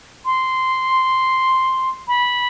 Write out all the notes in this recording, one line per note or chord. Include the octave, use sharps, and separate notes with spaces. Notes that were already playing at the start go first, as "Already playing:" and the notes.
C6
B5